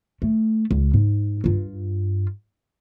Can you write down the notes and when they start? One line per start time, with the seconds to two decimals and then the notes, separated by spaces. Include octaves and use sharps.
0.22 A3
0.71 C#2
0.94 G#2
1.44 G2 F4